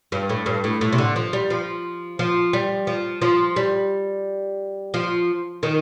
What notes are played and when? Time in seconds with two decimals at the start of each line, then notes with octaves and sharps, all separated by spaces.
0.12 G2
0.29 A2
0.46 G2
0.64 A2
0.81 A2
0.92 C3
0.98 D3
1.16 F3
1.33 G3
1.50 F3
2.19 F3
2.53 G3
2.87 F3
3.22 F3
3.56 G3
4.94 F3
5.63 D#3